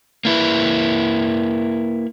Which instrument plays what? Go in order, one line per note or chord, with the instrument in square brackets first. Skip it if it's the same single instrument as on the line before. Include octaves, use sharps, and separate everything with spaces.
[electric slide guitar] A#3 E4 B4